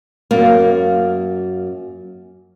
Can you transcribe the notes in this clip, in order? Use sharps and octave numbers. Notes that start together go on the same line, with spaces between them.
F#2 A#3